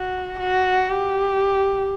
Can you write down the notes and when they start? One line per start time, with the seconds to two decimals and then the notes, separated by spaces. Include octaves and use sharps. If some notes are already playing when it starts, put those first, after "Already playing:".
Already playing: F#4
0.40 F#4
0.90 G4